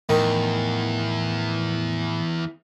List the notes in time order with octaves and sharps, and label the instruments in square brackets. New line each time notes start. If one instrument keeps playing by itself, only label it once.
[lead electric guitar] E2 [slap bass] A2 F3 [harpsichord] D#3